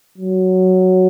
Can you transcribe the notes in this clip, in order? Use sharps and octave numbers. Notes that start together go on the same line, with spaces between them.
F#3